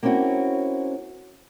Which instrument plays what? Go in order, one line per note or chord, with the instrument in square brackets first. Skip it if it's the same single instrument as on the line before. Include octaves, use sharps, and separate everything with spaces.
[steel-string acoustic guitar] A#3 C4 C#4 E4 F#4